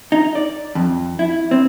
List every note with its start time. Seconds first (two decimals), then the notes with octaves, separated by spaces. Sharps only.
0.12 D#4
0.35 D5
0.75 F2
1.19 E4
1.51 C4